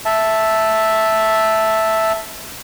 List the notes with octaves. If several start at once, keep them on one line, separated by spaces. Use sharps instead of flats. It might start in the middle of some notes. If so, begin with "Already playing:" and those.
E5 A5